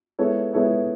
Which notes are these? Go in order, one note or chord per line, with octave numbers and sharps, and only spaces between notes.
G#3 B3 E4 A4 C#5
G#3 B3 E4 A4 C#5